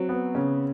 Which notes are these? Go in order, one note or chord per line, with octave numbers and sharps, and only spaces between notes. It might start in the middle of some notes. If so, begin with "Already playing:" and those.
Already playing: F#3 C4
B3
C#3 C#4